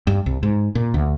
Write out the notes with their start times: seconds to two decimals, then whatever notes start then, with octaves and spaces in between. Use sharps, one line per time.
0.07 G2
0.26 C2
0.43 G#2
0.75 A#2
0.94 D2